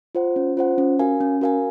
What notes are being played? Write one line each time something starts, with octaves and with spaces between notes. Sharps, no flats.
F4 C5 F#5
C#4
F4 C5 F#5
C#4
F#4 A#4 F5 G#5
C#4
F#4 A#4 F5 G#5